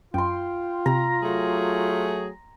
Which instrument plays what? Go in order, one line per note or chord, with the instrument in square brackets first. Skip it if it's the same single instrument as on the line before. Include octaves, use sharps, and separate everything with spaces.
[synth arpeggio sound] F#2 [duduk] F4 [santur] G5 C6
[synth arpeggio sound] C3 [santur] A#5
[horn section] F#3 A3 G#4